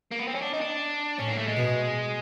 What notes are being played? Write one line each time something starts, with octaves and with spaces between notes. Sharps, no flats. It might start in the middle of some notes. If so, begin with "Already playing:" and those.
A#3
B3
C4
C#4
D4
D#4
D4
A2 C#4
A#3
A3
G#3
B2